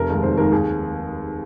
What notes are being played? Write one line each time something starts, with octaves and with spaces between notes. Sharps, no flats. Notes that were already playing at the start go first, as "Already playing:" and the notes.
Already playing: F1 A#4
D#2 D#3 G#3
F1 C5
D#2 D#3 G#3 A#4
D#2 G#4